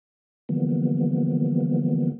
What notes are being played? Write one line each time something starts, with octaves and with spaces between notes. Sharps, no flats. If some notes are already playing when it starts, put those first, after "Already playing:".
D3 E3 F3 G3 A#3 B3